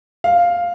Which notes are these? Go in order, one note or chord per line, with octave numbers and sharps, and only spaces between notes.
F5